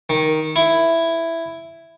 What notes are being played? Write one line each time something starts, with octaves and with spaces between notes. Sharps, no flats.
D#3
E4